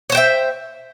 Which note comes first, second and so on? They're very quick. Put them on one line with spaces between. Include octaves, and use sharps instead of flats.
C#5 C5 G5 E5